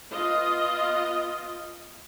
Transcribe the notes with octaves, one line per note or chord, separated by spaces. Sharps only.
B3 F4 D#5